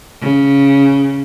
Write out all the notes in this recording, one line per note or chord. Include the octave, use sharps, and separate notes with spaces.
C#3